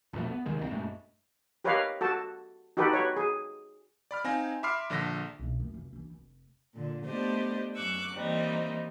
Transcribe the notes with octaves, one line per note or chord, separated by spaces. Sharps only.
A#1 F2 B2 A3
B3
D2 C3 D#3 G#3
C2 E3 C4
A#1 F#2 G#3 A3
G4 A#4 B4 C#5 D#5 F5
F#4 A4 A5
D#4 F#4 G4 A4 B4
F#4 B4 C#5
G#4
D5 B5 F6
C4 D#4 F5 G#5 A#6
E5 B5 C6 D6 F6 C7
A#1 D3 A4 A#6 B6
B1 D4
F#2 A3
F1
E3 D4
F1
A#2 D3
A3 B3 D4 G4 C5 D#5
F#2 C#6 D6 E6 F#6
E3 G3 A#3 C4 D#4